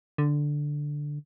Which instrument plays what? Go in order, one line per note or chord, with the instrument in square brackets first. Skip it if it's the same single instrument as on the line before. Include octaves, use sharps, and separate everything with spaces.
[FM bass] D3